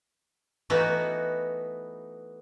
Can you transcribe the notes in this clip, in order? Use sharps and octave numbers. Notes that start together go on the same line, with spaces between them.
E3 A3 B3 D#4 F#4 B4